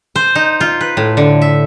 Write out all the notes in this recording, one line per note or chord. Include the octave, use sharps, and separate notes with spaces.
C5
D#4
F4
B4
A2
D3
E5